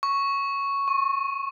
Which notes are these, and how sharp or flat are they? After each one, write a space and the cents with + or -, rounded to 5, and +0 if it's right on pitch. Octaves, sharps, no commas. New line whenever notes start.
C#6 +0
C#6 -40